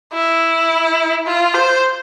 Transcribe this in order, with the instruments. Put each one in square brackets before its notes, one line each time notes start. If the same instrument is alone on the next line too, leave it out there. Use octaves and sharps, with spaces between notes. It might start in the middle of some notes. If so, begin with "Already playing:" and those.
[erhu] E4
F4
C5